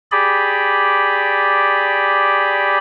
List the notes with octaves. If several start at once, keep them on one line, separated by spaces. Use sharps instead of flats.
G4 G#4 D5 B5